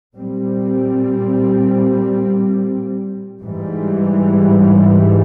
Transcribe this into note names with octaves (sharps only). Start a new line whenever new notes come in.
A#2 G3 C4
G#2 E3 G3